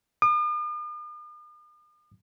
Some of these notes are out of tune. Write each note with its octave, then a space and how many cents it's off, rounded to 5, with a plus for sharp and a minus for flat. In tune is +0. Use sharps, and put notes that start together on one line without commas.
D#6 -45